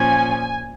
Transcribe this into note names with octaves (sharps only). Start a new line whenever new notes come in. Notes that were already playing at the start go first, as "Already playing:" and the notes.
Already playing: A#2 F3 C#4 G#5